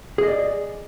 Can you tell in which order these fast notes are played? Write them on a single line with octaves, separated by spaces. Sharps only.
G#4 D#5 D5